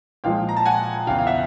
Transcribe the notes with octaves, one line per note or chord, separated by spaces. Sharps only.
A#2 F3 G#3 F5 G5
A#5
A5
F#5 G#5
E2 C#3 E3 F5 G5
F5
E5 F#5